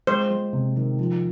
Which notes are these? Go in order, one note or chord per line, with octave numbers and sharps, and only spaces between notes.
G#3 C5
G#3
C3
D#3
F3